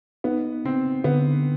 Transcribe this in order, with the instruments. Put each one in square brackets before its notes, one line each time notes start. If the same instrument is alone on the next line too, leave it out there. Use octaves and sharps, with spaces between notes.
[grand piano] B3 [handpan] D#4
[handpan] C#3 [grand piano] C4
[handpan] D3 [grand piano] B3